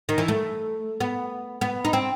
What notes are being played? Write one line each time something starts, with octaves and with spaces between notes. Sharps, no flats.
D#3
E3
A3
B3
B3
D#4
C4